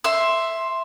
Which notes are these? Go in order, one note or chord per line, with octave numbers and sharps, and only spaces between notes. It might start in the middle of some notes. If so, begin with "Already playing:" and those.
E5 C6